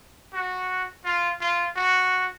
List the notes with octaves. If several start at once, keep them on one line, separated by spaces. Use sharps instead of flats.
F#4
F4
F4
F#4